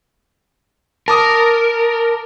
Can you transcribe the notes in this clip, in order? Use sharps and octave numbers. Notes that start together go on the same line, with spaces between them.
A#4 A5 D6 D#6